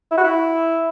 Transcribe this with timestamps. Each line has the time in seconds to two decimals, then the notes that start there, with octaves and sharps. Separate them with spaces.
0.11 E4
0.18 F#4
0.24 E4